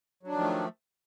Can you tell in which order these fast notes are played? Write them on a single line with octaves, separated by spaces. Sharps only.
F#3 D4 D#3 F3 A3